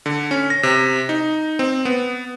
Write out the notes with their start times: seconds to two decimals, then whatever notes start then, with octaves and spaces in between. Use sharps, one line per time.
0.06 D3
0.31 C#4
0.50 A#6
0.63 C3
1.09 D#4
1.59 C4
1.85 B3